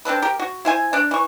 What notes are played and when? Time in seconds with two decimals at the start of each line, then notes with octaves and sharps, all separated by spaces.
0.05 C4 D4 A4 B4
0.22 G4 A#4
0.39 F#4
0.65 E4 C5 G#5
0.93 D4 D5
1.11 E3 C#6